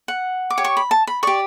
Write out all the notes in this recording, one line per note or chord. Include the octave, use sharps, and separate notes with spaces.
F#5
D6
G4 C#5
C#6
B5
A5
B5
G4 D5 C#6